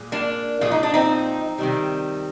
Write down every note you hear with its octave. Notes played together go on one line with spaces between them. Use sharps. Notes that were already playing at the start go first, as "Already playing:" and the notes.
Already playing: A#2 G#3
A#3 D4
A#2 F3 G#3 F4
D#4
D4
C4 D#4
C3 D#3 G3